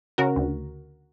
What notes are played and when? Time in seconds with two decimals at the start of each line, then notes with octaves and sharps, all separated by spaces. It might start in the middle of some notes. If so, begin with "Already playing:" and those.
0.18 C#3 F#4 A#4
0.36 D2